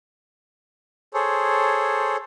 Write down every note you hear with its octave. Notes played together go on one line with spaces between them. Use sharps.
G#4 A4 C5 C#5